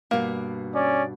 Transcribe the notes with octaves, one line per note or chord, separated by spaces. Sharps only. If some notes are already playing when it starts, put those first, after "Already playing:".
G2 B2 A#3
C#4 D5